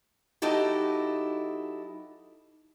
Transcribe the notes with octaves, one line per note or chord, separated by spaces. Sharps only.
F#3 D#4 E4 G4 A4